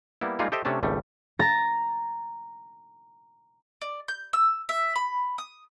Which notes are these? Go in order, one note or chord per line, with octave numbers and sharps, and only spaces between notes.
G3 A#3 B3 E4
G3 G#3 A#3 D#4 F4 G#4
G4 A4 C5 D#5 E5 G5
C3 A3 C#4 D4 A5
G#1 C#2 G3 A3
A#5 A6 A#6
D5
G6
E6
E5
B5
D#6